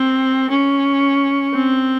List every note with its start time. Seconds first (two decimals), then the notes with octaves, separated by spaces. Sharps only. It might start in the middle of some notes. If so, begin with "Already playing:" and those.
Already playing: C4
0.50 C#4
1.54 C4